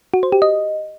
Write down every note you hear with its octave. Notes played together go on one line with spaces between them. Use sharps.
F#4
C5
G4
D#5